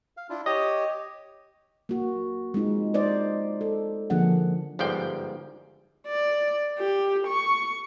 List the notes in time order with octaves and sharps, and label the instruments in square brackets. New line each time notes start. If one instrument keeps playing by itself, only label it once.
[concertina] F5
D4 E4 F4
[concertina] G4 C#5 [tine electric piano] D#5
[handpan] A#3 F#4
G#3 C4 D#4 F4
D#4 C5 D5 D#5
A4
D3 F3 A#3 D4 G#4 F#5
[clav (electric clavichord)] G1 G#2 F3 D5 G5
[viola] D5
G4
C#6